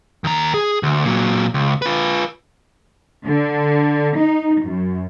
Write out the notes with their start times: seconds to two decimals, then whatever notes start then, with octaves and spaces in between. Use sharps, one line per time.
0.24 D#2 A#5
0.54 G#4
0.83 D2
1.05 A#2 F#3
1.54 C#2
1.82 F4 B4
3.25 D3
4.17 D#4
4.63 F#2